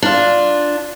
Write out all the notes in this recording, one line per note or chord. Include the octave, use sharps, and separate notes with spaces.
D4 F4